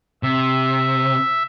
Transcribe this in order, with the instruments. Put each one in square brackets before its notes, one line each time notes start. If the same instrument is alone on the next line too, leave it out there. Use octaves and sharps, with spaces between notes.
[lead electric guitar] C3 [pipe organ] E5